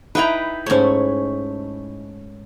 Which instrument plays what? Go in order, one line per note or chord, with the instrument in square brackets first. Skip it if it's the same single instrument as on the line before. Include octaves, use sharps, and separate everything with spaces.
[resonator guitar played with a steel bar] D#4 E4 [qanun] B4 G5 A#5
[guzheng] G#2 C#5 [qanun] A3 C#4